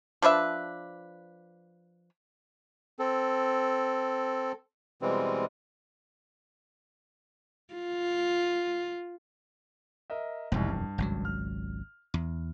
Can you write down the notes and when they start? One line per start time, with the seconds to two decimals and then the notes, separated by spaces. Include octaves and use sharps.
0.22 F3 D4 B4 E5
2.99 C4 A4
5.02 B2 E3 G3 G#3 C4
7.74 F4
10.10 A#4 D#5 E5
10.52 E1 C2 F2 G#2
10.69 G2
10.98 G#1 C#2 F#3
11.25 F6
12.14 E2